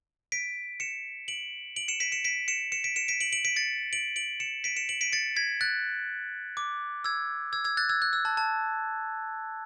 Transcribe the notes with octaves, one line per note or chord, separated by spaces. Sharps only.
B6 D7
C#7 E7
D7 F#7
D7 F#7
C#7 E7
B6 D7
C#7 E7
B6 D7
C#7 E7
C#7 E7
B6 D7
C#7 E7
B6 D7
D7 F#7
D7 F#7
B6 D7
A6 C#7
D7 F#7
D7 F#7
C#7 E7
B6 D7
C#7 E7
D7 F#7
B6 D7
A6 C#7
G#6 B6
F#6 A6
D6
E6 G#6
E6 G#6
E6 G#6
F#6 A6
E6 G#6
F#6
E6
A5
A5